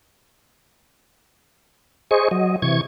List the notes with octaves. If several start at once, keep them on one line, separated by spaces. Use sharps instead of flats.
G#4 C5 D#5 C#6
F#3 D#5
C3 E3 C#6 G#6